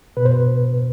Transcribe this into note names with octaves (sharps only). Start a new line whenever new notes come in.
B2 B4
C5
B4